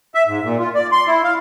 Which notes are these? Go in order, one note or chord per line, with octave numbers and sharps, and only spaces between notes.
E5
G#2
A#2
F4
D5
C6
E4
F5